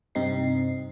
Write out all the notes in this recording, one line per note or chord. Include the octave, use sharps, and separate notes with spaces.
G2 C3 C4 D#4 C7